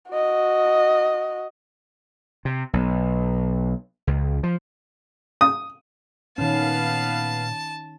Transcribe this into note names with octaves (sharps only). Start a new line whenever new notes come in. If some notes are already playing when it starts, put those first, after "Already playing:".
F#4 D#5
C3
B1
C#2
F3
D#6
A#2 D#3 B3 C#4 B4 F5 A5